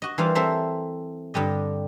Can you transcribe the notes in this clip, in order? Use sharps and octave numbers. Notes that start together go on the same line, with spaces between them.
F#4 D#5
E3 G3 F4 A#4 C5 F5
C4 A4 C5 E5 A#5
G2 D3 G3 D#5